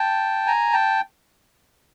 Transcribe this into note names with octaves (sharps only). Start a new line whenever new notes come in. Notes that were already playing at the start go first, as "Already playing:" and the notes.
Already playing: G5 A5
G#5 A#5
G5 A5